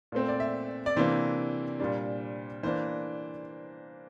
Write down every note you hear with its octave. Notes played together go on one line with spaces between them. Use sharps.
A#2 A3 C4
D5
E5
D5
C3 E3 A#3 D4 C5
A#2 G3 D4
E3 A#3 D4 C5